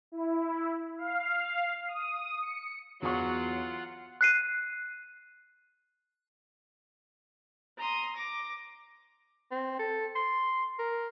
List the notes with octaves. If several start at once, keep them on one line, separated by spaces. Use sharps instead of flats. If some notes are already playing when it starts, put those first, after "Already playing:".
E4
F5
D#6
C#7
E2 F#3 F4 F#5 C#6
F#6 C7 D#7
A#5 C6 D#6
D6 A#6
C4
A4
C6
A#4